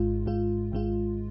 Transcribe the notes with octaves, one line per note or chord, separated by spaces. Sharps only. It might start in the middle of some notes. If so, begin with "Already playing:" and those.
Already playing: G#1 G#2 G#3 F4
G#1 G#2 G#3 F4
G#1 G#2 G#3 F4